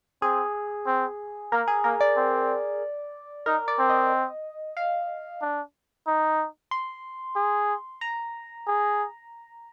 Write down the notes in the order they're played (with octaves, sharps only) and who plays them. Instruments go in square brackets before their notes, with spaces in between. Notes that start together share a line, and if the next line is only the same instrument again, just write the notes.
[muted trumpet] C4 [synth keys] G#4
[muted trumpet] C4
[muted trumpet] A#3 [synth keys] A#4
[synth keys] G#4
[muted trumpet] A#3 [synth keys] A#4
[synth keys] D5
[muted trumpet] C4
[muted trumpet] D#4 [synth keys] A#4
[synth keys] D5
[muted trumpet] C4
[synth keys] D#5
F5
[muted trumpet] D4
D#4
[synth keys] C6
[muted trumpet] G#4
[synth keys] A#5
[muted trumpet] G#4